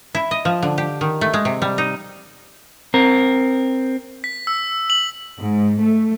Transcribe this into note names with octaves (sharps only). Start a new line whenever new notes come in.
E4
D#5
F3
D3
G4
D#3
A3
G#3
C3
G3
D#4
C4 A#4
B6
E6
F#7
G#2
A3